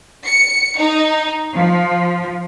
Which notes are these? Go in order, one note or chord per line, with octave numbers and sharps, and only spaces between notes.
C#7
D#4
F3